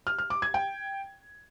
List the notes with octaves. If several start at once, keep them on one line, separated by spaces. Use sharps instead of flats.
F6
F6
D6
G#6
G5